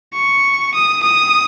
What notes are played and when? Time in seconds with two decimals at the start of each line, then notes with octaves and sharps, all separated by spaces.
0.14 C#6
0.74 D#6
1.03 D#6